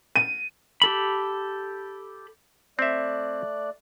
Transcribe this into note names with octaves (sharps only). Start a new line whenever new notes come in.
D#7
G4 A4 B5
A3 C4 D5 E5 F#6